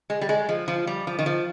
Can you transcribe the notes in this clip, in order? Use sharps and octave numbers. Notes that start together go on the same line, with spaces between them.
G#3
G3
G#3
F3
F3
G3
F3
D#3
F3